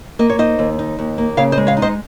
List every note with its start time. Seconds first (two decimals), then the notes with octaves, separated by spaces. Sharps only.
0.19 A#3 D#5
0.30 C#5
0.39 D#4 C5 D#5
0.59 D#2
0.79 D#4
0.99 D#2
1.18 A#3
1.37 C#3 C#5 F5
1.52 C5 D#5
1.58 G#3
1.67 C#5 F5
1.77 D#4
1.82 C5 D#5